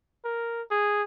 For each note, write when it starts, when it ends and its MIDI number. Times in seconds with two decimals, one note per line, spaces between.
0.24 0.62 70
0.71 1.02 68